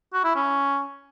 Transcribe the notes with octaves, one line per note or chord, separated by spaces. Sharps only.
F#4
E4
C#4